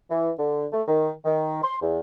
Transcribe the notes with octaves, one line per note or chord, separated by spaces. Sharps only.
E3
D3
A3
D#3
D#3
C6
E2